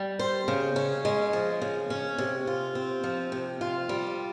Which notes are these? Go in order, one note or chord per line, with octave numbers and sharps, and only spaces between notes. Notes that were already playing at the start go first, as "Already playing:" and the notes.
Already playing: G3
C5
C#3
C#4
G#3
F3
C#3
C#4
C3
F4
C4
F3
C3
F4
G3